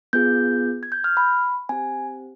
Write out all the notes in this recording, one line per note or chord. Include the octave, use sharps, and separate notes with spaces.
B3 F4 G#4 G6
G#6
G6
F6
B5
C4 G4 G#5